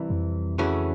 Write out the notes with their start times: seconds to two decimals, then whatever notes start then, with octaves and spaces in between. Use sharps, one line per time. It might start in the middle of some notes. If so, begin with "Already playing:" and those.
Already playing: C2 C3 E3
0.10 F2
0.58 C#3 E3 A3 C#4 F#4